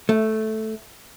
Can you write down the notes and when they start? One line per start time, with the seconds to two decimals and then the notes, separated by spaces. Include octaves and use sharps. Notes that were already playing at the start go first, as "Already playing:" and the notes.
0.09 A3